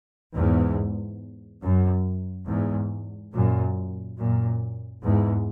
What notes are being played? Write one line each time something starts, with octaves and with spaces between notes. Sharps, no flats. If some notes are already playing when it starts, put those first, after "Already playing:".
E2 G#2
F#2
E2 G#2
F#2 A#2
F#2 A#2
E2 G#2